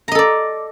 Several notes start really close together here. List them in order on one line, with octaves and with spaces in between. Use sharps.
A#5 D#5 A4 D5